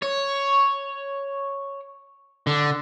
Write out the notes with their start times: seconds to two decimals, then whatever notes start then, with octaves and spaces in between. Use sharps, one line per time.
0.02 C#5
2.47 D3